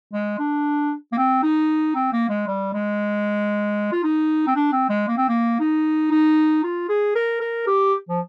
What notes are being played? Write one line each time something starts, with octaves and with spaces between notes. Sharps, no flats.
G#3
D4
A#3
C4
D#4
C4
A#3
G#3
G3
G#3
F4
D#4
C4
D4
C4
G#3
A#3
C4
A#3
D#4
D#4
F4
G#4
A#4
A#4
G4
F3